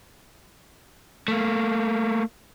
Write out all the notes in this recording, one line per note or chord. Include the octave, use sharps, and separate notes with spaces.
A3 A#3